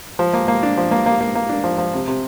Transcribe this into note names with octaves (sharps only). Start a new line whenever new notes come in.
F3
A#3
A#3
D4
F3
A#3
A#3
A#3
A#3
D4
F3
F3
C3
C3